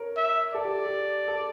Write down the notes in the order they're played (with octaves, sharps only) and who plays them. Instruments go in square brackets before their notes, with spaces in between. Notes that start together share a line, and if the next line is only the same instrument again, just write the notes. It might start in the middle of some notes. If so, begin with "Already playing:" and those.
Already playing: [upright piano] A#4 C#5
[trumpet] E5
[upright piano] A4 [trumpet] D5
[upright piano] G4
G4
A4